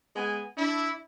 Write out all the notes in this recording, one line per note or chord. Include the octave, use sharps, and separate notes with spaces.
G#3 B3 G#5
D4 E4